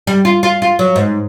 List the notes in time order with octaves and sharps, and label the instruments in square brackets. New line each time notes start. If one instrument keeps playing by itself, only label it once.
[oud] G3
F4
F4
F4
F#3
G#2